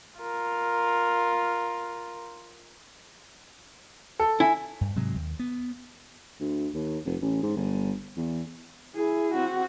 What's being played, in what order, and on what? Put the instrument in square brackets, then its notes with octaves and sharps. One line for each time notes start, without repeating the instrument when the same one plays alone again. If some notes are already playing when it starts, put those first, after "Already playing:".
[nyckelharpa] F4 A#4
[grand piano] A4
[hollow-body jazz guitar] E4 [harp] G#5
[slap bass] G2
G#2 C3 F#3 G#3
D#2
B3
[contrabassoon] D2
D#2
F1
A1
G#2
G1
E2
[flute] E4 [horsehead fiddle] G#4
[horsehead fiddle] C4 F#4